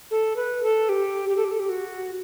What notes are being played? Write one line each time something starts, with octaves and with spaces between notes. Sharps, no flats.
A4
B4
A4
G4
G4
A4
G4
A4
G4
F#4